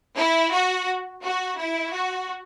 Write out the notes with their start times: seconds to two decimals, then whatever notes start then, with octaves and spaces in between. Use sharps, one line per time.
0.17 E4
0.51 F#4
1.22 F#4
1.56 E4
1.91 F#4